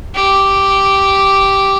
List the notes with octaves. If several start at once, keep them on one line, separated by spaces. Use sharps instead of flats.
G4